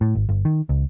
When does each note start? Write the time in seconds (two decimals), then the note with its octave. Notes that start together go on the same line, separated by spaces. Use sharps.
0.01 A2
0.15 G#1
0.29 G1
0.45 D#3
0.69 C#2